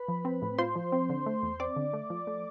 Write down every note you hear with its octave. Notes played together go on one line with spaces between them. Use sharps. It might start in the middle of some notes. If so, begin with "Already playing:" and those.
Already playing: B4 B5
F3
C4
A2
F4 C5 C6
F3
C4
D3
A3
E2
C4 D5 D6
D3
A3
F3
A3